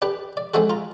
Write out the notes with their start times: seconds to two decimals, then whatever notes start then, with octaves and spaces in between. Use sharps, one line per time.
0.02 D4 G4 B4
0.37 D5
0.54 G#3 C4 D#4 F#4 A4
0.70 F4 A#5